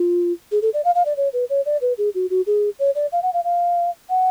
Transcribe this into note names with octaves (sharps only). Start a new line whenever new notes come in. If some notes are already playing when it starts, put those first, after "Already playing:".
Already playing: F4
G#4
A4
D5
F5
F5
D5
C#5
B4
C#5
D5
B4
G#4
F#4
F#4
G#4
C#5
D5
F5
F#5
F5
F5
F#5